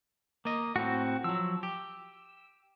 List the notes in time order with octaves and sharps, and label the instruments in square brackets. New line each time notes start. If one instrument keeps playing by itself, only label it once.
[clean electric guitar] A#3 D#5
[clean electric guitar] A2 [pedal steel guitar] C4 F#4
[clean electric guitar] F3 F#3 [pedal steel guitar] E6
[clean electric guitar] G4